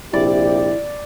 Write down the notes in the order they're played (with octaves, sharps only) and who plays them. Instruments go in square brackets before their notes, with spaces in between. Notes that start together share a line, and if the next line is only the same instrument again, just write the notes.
[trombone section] A#1 C3 G4 [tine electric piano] E4 [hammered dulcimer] D5